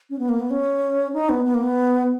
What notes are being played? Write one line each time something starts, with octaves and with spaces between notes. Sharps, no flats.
C#4
B3
A#3
B3
C#4
D#4
B3
B3
A#3
B3